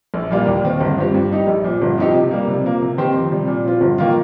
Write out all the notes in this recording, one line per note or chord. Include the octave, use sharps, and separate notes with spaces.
A#1
A#2 G3 A#3 F4
D#2
D#3 C4
G1
G2 F3 C4 G4
G2
G3 D#4 G4
A#1
A#2 F3
G1
F2 F3 D#4 G4
C3
G3 A#3
C3
F3 A#3
C3
D#3 C4 G4 C5
F2
C3 G3
A#2
F3 C4 F4
G1
D#3 A#3 F4